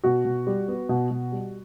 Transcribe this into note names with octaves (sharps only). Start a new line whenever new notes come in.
B2 F#4
B2
G3
B3
B2
B2
G3